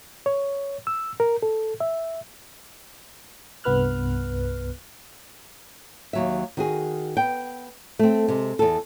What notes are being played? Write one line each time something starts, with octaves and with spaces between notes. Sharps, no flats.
C#5
E6
A#4
A4
E5
C2 G2 B3 B4 F6 F#6
D#2 F#3 E5
D#3 F#4 G#4
B3 G5
A3 C4
C3 G#3
E2 A4